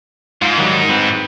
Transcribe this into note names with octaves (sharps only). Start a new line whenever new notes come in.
G#2 F4
D#3 F#3 G3
C4 B4